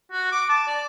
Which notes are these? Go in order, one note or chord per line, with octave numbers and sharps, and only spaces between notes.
F#4
D6
A5
D5